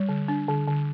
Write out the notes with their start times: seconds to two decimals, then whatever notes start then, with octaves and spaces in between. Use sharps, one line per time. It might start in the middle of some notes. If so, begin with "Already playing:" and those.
Already playing: G3
0.09 D3
0.28 D4
0.48 D3
0.67 D3